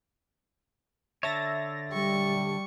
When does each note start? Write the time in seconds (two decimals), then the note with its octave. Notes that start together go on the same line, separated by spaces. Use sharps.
1.23 D3 A4 C#5 E5 A6 A#6
1.93 G3 C#6